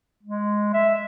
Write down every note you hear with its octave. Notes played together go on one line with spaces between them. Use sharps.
G#3
E5